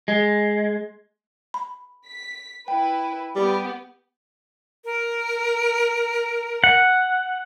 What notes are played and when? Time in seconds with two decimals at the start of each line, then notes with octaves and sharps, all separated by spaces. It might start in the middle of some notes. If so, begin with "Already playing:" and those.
0.08 G#3
1.54 B5
2.07 B6
2.68 E4 B4 G5
3.36 G3 B3 G4
4.85 A#4
6.64 F#5